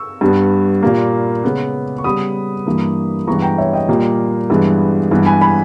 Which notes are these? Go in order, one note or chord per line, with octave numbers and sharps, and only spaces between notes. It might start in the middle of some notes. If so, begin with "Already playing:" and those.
Already playing: C#6 E6
G2 G3 B3
A#2 G3 A#3
C#3 G#3 B3
C#6
C#3 G3 B3 B5 D#6
G2 E3 A#3
G2 E3 G#3 B3 A#5 C#6
G5 A#5
C#5 E5
D#5 G5
A#2 G3 A#3
G2 E3 G#3 B3
G2 E3 G#3 B3
G#5 B5
G#5 B5